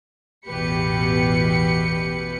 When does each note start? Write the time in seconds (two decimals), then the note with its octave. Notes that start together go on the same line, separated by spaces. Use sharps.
0.47 A1 E2 B2 G4 B4 C#7